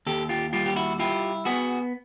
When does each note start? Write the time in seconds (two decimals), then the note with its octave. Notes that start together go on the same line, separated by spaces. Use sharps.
0.06 D#2 G4 A4
0.29 F4 G4
0.53 G3 F4 G4
0.66 G4
0.76 E4 F#4
0.99 E4 F4 G4
1.45 B3 F#4 G#4